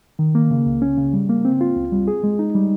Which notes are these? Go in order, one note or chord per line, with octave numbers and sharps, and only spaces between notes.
D#3
A#3
C#3
C#2
C#4
C#3
G3
A#3
C4
F4
C#2
G3
G#4
G#3
D#4
G3